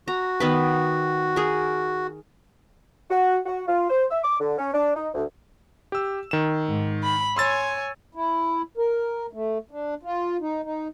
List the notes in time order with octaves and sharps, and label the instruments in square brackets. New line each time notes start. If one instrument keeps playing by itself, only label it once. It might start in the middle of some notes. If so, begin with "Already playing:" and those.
[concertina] F#4 [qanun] A#5
[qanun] D#3 B3 B4
G#4 A#4
[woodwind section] F#4
F#4
F4
C5
E5
D6
D3
C#4
D4
D#4
D2
[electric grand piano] G4 E6
D#3 E7
[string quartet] G#2
B5
[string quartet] C#5 G#5 [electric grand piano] C6 E6 A6
[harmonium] E4
A#4
A3
D4
F4
D#4
D#4